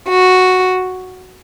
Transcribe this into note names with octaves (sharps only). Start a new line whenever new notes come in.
F#4